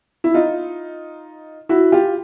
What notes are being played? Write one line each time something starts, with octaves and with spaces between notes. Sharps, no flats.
E4
D#4 F4
E4 F#4
F4 G4